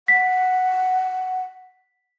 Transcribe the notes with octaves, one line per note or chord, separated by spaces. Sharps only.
F#5 B6